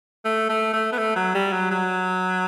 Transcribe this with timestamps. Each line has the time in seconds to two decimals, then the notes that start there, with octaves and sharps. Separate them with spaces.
0.25 A3
0.49 A3
0.74 A3
0.92 B3
0.98 A3
1.16 F#3
1.35 G3
1.53 F#3
1.71 F#3